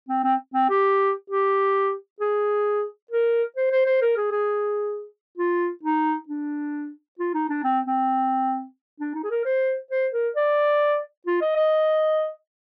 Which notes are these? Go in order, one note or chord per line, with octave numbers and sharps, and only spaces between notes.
C4
C4
C4
G4
G4
G#4
A#4
C5
C5
C5
A#4
G#4
G#4
F4
D#4
D4
F4
D#4
D4
C4
C4
D4
D#4
G#4
A#4
C5
C5
A#4
D5
F4
D#5
D#5